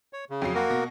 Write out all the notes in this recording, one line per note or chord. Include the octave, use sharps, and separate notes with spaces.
C#5
C#3
F2 F#3 C7
A#3 F#4 A#4
B2 A#6